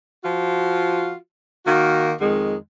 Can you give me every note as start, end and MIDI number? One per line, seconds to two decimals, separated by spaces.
0.24 1.14 53
0.24 1.14 65
0.24 1.14 66
1.66 2.12 51
1.66 2.12 58
1.66 2.12 66
2.21 2.55 41
2.21 2.55 51
2.21 2.55 56